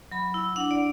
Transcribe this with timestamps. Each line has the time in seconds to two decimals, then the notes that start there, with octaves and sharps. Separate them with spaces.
0.12 F#3 B5
0.34 E4
0.56 D4 F#5
0.71 D5